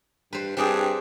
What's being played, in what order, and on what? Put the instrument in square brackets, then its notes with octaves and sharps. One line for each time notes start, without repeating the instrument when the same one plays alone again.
[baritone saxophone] G2 [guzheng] B4 C5
[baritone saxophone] G2 [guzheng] C4 D4 G#4